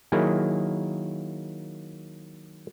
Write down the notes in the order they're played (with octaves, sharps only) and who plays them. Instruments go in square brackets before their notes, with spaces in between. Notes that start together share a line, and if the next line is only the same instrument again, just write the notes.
[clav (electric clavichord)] D#3 F#3 A#3 E4 G#4